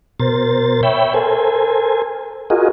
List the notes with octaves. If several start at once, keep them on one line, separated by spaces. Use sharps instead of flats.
B2 A#4 C5 A6
C#5 E5 G5 B5
A4 A#4 C5 G#5
F4 F#4 G#4 A#4 D#5